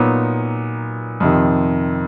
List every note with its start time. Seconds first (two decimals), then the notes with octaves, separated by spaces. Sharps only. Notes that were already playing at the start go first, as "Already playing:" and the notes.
Already playing: A#2 F#3 B3 D#4
1.20 F2 C3 D#3